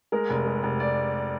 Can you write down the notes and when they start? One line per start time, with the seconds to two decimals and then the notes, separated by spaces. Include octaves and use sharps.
0.12 G#3 A#4
0.30 F1
0.46 G#3
0.63 F1
0.80 D5